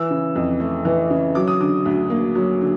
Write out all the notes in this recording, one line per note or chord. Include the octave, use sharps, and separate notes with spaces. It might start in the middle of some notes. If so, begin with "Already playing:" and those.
Already playing: E3 E6
C#3
F2
A3
E3
C#3
F#3 D6
D#6
D3 D6
D2
A#3
F#3
D3